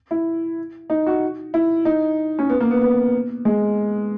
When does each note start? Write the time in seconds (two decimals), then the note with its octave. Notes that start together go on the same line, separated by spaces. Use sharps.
0.11 E4
0.90 D#4
1.06 F#4
1.54 E4
1.85 D#4
2.39 C#4
2.50 B3
2.60 A#3
2.71 B3
2.82 B3
3.45 G#3